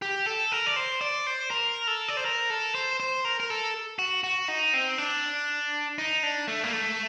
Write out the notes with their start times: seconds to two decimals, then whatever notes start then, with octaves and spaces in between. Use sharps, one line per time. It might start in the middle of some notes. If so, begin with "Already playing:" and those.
0.02 G4
0.26 A4
0.52 A#4
0.66 D5
0.76 C5
1.01 D5
1.27 C5
1.51 A#4
1.87 A4
2.08 D5
2.17 C5
2.25 A#4
2.50 A4
2.75 C5
3.00 C5
3.25 A#4
3.40 A#4
3.50 A4
3.99 F#4
4.24 F#4
4.48 D#4
4.74 C4
4.98 D4
5.98 D#4
6.23 D4
6.48 A3
6.63 A#3
6.73 A3